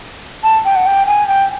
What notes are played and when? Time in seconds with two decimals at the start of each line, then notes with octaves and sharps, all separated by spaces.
0.44 A5
0.65 G5
0.76 F#5
0.87 G5
1.07 G#5
1.28 G5